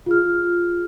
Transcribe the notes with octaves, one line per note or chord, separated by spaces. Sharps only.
F4 G#4 F6